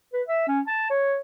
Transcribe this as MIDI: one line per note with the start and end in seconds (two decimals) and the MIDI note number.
0.13 0.22 71
0.28 0.45 76
0.48 0.60 61
0.67 0.90 81
0.90 1.19 73